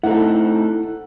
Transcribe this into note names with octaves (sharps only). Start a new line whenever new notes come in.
A3 C4 D#4 E4 A4 F#5